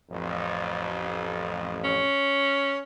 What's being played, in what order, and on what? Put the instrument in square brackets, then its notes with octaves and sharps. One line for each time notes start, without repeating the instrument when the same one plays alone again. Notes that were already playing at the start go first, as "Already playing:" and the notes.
[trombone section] A1 F2
[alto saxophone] C#4